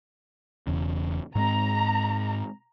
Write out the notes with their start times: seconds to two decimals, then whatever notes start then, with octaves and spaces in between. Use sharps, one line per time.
0.67 E1 E2 C#3
1.35 G#2 G#3 C4 A#5